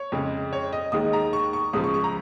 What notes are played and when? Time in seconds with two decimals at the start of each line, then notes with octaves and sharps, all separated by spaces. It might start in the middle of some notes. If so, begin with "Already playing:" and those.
Already playing: C#5
0.12 F2 C#3 G#3
0.53 C#5
0.73 D#5
0.92 D#2 D#3 G#3 D#6
1.13 A#5
1.33 C#6
1.53 C#6
1.73 C#2 C#3 F3 D#6
1.84 C#6
1.94 C#6
2.04 A#5